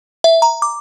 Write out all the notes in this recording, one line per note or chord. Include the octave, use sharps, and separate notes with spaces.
E5
A#5
D6